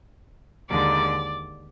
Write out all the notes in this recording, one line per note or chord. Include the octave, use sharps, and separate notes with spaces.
D#2 D3 G#3 D5 D6